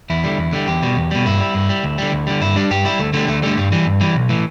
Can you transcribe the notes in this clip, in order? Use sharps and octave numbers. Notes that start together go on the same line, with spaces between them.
E2 E4
D3 G3
E2
D3 G3
E2 G4
B2 G3
E2
B2 G3
G2 E4
G3
G2
G3
D2
D3 G3
D2
D3 G3
G2 E4
G3 D4
G2 G4
G3 E4
D2 A3
D3 G3 A3
D2 A3
D3 G3 A3
G2 G3
E3 G3
G2
E3 G3
B1
A2 E3